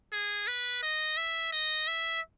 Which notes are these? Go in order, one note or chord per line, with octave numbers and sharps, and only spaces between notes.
G#4
B4
D#5
E5
D#5
E5